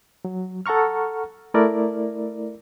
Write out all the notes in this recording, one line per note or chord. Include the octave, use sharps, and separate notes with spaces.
F#3
A4 F#5 A#5 C#6 F6
A3 E4 A#4 D5